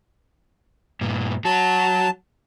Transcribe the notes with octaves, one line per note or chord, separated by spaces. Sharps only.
G2 A#2
F#3 F#4 A5